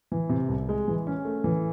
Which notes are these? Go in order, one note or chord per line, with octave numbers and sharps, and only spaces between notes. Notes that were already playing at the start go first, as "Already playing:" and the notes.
E3
C3
C2
G#3
E3
C#4
A3
E3